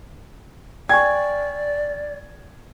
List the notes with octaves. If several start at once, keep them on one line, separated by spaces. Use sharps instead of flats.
D5 G5 G#5 C#6 G#6